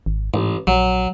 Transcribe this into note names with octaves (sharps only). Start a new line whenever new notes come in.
G#1
A1 G#2
A#1 F#3